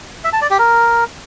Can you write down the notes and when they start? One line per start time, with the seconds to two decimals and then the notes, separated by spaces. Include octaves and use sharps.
0.24 E5
0.33 A5
0.42 D5
0.50 G4
0.59 A#4